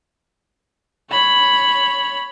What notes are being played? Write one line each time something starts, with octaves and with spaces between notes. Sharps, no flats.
C#5 B5